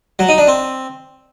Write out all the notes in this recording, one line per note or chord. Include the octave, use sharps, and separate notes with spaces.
F#3
D#4
D4
C4